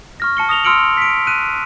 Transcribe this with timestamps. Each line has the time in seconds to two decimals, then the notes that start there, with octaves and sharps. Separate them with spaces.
0.20 C#6 F6 A#6
0.37 A5 C#7 G7
0.49 D#6 A#6 F7 G7
0.64 C6 E6 F6 C#7 D7 F#7
0.97 B6 D7
1.27 F#6 D#7